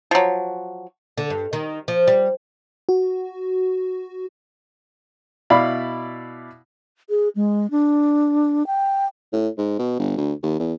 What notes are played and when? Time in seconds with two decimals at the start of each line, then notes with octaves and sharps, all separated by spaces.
0.11 F3 F#3
1.18 D3
1.30 G2
1.53 D#3
1.88 F3
2.07 G3
2.89 F#4
5.50 B2 E4 D5 F5 B5
7.10 G#4
7.36 G#3
7.71 D4
8.67 G5
9.33 A2
9.58 G#2
9.79 B2
9.99 G1
10.17 D2
10.43 D#2
10.59 E2